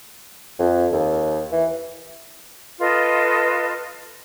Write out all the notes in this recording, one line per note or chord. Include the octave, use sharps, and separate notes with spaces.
F2
D#2
E3
F4 A4 B4 D#5